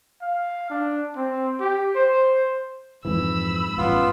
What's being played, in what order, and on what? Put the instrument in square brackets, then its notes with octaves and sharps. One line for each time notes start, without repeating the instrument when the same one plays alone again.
[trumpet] F5
D4
C4
G4
C5
[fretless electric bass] F2 G#2 E3 [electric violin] B5 E6
[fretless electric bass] A1 G2 C#4 [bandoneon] B3 F4